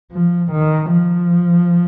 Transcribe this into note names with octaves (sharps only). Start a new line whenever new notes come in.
F3
D#3
F3